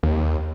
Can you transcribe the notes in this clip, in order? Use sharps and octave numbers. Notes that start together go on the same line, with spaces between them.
D#2